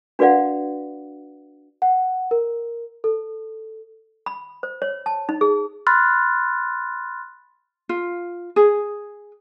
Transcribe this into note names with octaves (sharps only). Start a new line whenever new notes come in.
D4 F#4 B4 D5 F5 F#5
F#5
A#4
A4
B5
C5
C#5
A5
D#4
G#4
B5 C6 F6 F#6 A6
F4
G#4